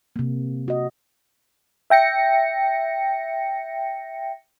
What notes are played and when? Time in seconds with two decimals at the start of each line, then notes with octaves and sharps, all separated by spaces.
0.16 C3 A#3
0.68 F#4 D#5
1.90 E5 G5 A#6 C#7